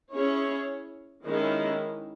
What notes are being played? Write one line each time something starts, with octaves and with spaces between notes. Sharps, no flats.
C#4 E4 G#4 C#5
D#3 G#3 C#4 E4